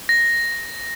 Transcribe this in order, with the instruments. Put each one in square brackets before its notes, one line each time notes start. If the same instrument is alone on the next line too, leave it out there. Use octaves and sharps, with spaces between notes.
[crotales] A#6